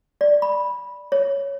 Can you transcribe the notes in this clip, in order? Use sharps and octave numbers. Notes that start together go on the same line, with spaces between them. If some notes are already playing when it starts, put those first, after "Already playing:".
D5
B5
C#5